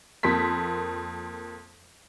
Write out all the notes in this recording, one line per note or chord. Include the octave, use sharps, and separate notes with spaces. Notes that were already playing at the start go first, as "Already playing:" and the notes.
F2 A#3 C6 B6